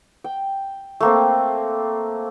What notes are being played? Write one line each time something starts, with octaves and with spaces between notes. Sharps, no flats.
G5
A3 A#3 C4